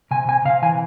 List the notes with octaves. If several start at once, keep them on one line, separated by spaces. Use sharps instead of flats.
C3 G#5
C3 G#5
C3 F5
E3 G#5